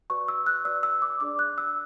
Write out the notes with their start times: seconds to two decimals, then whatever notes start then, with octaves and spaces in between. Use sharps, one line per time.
0.10 F#4 B4 D5 C#6
0.28 E6
0.46 F#6
0.65 F#4 B4 D5 E6
0.83 E6
1.02 D6
1.20 D4 G#4 D5 D6
1.39 F#6
1.58 E6